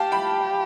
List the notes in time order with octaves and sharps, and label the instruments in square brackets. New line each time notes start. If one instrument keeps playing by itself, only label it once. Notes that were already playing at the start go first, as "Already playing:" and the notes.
Already playing: [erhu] G4 [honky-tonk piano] F5 A5
[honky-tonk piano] G5 B5